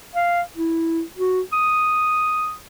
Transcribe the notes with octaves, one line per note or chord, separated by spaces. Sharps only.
F5
E4
F#4
D#6